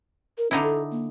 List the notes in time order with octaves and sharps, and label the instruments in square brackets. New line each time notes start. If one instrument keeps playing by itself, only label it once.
[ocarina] A#4
[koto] D3 D#4 E4 [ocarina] C#4
[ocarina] A4
A#3